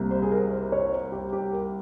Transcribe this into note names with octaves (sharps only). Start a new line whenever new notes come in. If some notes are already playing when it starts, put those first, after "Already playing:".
Already playing: C2 C3 G3 A#3
C5
G#4
A#4
C5
C#5
C5
G4
G4
A#4